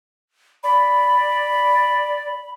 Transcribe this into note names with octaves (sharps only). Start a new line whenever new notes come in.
D5 B5